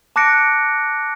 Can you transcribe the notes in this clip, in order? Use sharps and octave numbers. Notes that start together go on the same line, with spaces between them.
A5 D6 F#6 A#6 C#7 D7